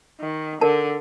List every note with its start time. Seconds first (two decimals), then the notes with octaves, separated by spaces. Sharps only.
0.21 D#3
0.61 D3 A#4 A5